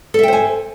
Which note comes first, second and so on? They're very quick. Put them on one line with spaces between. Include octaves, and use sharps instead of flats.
A4 E5 G5 C5 G#5